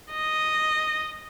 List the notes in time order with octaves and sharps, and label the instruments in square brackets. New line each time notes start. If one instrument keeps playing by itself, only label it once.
[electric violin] D#5